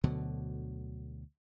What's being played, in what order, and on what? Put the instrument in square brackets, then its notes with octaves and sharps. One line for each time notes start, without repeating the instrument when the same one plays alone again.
[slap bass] D2 B2 D3 F#3